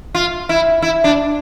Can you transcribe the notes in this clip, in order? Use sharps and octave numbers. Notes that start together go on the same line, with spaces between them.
F4
E4
E4
D4